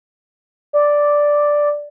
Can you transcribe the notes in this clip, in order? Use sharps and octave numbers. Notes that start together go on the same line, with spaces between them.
D5